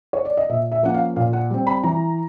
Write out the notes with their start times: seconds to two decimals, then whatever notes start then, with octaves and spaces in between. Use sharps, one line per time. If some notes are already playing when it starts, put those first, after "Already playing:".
0.13 C#5
0.25 D5
0.37 D#5
0.49 A#2 E5
0.72 E5
0.83 F3 A#3 C#4 F#5
0.94 F5
1.16 A#2 F5
1.33 F#5
1.50 G3 C4
1.67 B5
1.83 E3 A#5